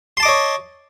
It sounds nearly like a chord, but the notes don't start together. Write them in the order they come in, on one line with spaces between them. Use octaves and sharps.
C6 A5 D6 D#5 C#5